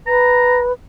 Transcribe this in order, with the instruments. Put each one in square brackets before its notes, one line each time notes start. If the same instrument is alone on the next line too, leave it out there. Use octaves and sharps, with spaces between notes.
[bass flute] B4 [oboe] A#5